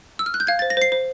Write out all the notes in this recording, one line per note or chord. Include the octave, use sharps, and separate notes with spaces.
E6
F6
F#6
G6
F5 G#6
A6
C5
A#6
C5 C7
C5